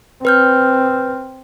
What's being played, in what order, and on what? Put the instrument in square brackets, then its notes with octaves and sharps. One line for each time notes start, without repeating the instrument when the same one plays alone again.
[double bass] C4 [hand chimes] B4 F6 G6